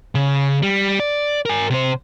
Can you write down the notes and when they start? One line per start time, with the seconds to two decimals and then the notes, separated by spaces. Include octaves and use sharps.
0.15 C#3
0.63 G3
1.00 D5
1.46 A#4 G#5
1.70 C3 C5